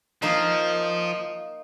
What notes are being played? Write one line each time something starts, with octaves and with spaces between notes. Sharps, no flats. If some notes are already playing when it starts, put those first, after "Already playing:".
F3 A#3 D#4 F5